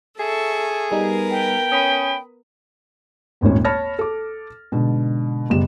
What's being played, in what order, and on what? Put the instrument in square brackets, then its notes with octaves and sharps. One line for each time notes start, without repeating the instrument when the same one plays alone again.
[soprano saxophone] G#4 [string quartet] A4 E5 C#6
[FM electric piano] G3 D#4 [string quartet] B3 A#4 B4
[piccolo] G5
[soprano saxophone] C#4 [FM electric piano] B5 D#6
[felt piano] D#1 G#1 D#2 C#4
C#5 A5 B5 F6 A6 A#6
A4 D6
G#2 B2 D3
F#1 G3 B3 E7